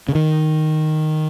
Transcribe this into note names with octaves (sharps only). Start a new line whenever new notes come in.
C#3
D#3